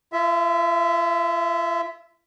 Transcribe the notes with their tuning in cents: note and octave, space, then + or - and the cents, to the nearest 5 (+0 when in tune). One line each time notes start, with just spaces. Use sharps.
F4 -40 E5 +0